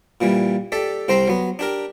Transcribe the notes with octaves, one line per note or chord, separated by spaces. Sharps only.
A#2 E3 G3
G4 A4 D5 E5
C2 C4 C5 G5 A#5 C6
F#3 B3
D4 G4 A#4